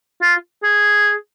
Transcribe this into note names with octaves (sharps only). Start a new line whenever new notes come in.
F4
G#4